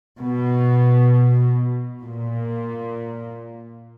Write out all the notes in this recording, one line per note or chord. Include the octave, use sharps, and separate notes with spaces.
B2
A#2